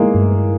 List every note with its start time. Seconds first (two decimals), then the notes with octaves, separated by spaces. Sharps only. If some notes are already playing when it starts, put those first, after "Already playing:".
Already playing: G#3 A#3 E4
0.15 G2